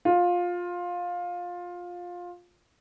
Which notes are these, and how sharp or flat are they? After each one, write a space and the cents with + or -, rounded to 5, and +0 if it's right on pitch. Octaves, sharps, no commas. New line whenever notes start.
F4 +15